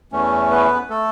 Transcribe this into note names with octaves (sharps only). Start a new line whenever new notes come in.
E2 E3 A3 C#4
B3 B4
A3 A4